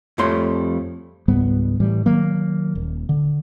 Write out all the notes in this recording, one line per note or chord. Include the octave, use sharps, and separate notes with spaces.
F2 F3 G3 A3 C#5 C6
C#2 G#2 G3 B3
A2 E3 G3
D#3 F#3 A#3
D#1
D3